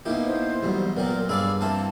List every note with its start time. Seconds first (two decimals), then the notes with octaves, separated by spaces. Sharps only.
0.05 B2 A#3 C#4 D#4 E4 G4
0.26 C5
0.63 E2 G#2 F#3 G3
0.96 A#2 F#3 G3 B3 A#4
1.29 G2 G#4 D5 F5 D6 E6
1.61 A#3 C4 E4 A5